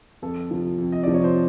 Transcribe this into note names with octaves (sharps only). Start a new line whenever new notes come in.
F2 A4
C3 F3
F2
D#5
C3 F3 D5
C#5
C5